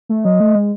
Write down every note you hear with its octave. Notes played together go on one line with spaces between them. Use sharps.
A3
F#3 D#5
A3
G#3